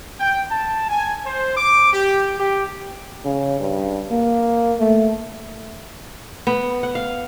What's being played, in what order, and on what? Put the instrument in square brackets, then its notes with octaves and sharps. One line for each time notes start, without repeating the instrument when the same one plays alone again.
[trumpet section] G5
A5
G#5
C5
D6
G4
G4
[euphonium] C#3
G2
A#3
A3
[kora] B3
F#5
F5